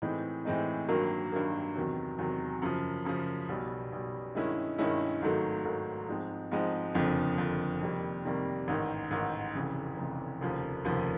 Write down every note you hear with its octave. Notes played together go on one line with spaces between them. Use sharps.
A2 E3 G#3 C4 D#4
A2 E3 G#3 C4 D#4
G2 D#3 F#3 A#3
G2 D#3 F#3 A#3
E2 C3 D#3 F#3
E2 C3 D#3 F#3
F#2 C#3 F3
F#2 C#3 F3
B1 B2 G3
B1 B2 G3
G2 D#3 G#3 C#4 E4
G2 D#3 G#3 C#4 E4
G#1 G#2 D#3 F#3 A3
G#1 G#2 D#3 F#3 A3
G#2 F3 G#3 C4 D#4
G#2 F3 G#3 C4 D#4
F#1 F2 D3 F3
F#1 F2 D3 F3
F2 C3 D#3 G3 A#3
F2 C3 D#3 G3 A#3
A1 G#2 D#3
A1 G#2 D#3
F1 F2 C#3 E3
F1 F2 C#3 E3
F1 D#2 C#3 F3
F1 D#2 C#3 F3